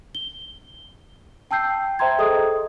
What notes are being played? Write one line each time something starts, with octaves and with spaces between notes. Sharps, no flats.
G7
G5 A5 E6 G6 C7
C5 E5 G5 A#5 C6 G#6
G#4 A4 D#5 D#6